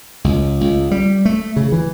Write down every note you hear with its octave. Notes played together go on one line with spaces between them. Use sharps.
C#2
C#2
G3
A3
C#3
E3